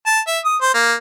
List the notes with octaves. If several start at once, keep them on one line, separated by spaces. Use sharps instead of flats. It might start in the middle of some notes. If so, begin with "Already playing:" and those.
A5
E5
D#6
C5
A#3